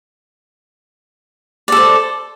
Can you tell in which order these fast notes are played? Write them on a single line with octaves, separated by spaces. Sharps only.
D5 A4 C5